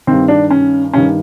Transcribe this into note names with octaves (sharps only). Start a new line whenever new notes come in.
G2 D#3 C4
D4
C#4
G2 D#3 C#4